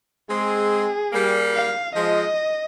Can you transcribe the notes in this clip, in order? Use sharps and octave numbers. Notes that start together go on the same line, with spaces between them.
G#3 C4 G#4
G3 A#3
F5
F3 G#3 D#5